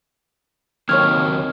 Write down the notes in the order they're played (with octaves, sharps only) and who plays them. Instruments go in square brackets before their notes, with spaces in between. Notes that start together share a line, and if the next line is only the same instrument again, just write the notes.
[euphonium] D#2 [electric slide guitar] D#3 F#3 C4 [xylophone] C#5 C#6 G#6 [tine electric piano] F6